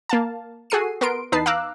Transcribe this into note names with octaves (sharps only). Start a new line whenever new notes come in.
A#3 F5 A5
F#4 G#4 A4 C7 D#7
B3 A#4 C6 D7
E2 D#4 B4 A5 C7
F5 A#5 D6 E6 F#6